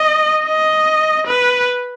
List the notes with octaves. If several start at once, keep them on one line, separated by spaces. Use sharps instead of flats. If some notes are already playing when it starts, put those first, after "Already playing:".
Already playing: D#5
D#5
B4